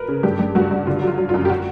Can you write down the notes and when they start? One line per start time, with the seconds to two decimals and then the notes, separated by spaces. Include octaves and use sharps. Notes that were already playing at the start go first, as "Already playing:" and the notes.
Already playing: A#4 B4
0.08 C#3
0.23 G2 G4
0.39 G2
0.55 G2 F#4
0.71 G2
0.87 D3 F4
1.02 F#3
1.07 F4
1.18 F#3
1.29 F#2 F4
1.45 G4
1.50 F#4